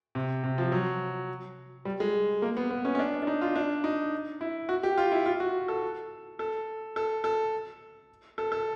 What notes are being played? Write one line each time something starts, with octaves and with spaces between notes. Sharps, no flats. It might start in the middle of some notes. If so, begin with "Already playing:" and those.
C3
C3
F3
F#3
G3
G#3
A#3
B3
B3
C#4
C#4
D4
D4
D#4
F4
D4
D#4
E4
F#4
G4
F4
E4
F4
F#4
A4
A4
A4
A4
A4
A4